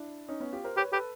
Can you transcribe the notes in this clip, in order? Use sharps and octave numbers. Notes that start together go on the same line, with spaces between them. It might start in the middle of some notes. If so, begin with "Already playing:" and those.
Already playing: D4 E4
C#4 D#4
B3 C#4
F4 G4
A#4 C5
G4 B4 C#5
G4 A4 B4